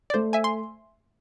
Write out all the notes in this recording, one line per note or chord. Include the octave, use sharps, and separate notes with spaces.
D5
A3 C5
E5 G#5
C6